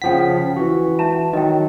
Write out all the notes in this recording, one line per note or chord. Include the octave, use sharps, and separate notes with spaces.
C#3 F3 F#5 G5 B6
E3 F#4
E5 A5 A#5
D#3 F#3 D#5 G5